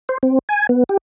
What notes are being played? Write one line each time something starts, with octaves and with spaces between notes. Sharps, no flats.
C5
C4
G#5
B3
G4